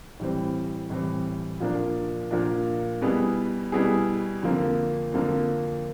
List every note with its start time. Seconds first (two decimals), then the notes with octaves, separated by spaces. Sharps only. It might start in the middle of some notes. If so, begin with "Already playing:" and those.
0.20 A2 E3 G3 C4
0.90 A2 E3 G3 C4
1.60 A#2 F3 A#3 D4
2.31 A#2 F3 A#3 D4
3.02 B2 G3 B3 E4 G#4
3.72 B2 G3 B3 E4 G#4
4.42 F2 D3 F3 A#3
5.13 F2 D3 F3 A#3